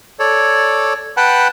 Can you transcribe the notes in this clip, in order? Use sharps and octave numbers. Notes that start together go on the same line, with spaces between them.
A4 C#5 D5
B4 F#5 G5 A5 B5